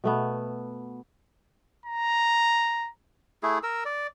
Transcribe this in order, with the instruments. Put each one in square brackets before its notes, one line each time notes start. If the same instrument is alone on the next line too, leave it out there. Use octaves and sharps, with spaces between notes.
[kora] B2 A3 B3
[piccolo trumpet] A#5
[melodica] A3 E4 G#4
A#4 E6
D5